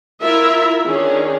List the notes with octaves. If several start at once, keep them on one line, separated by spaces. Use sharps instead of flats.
E4 F4 A#4 E5
D#3 C#4 D4 G#4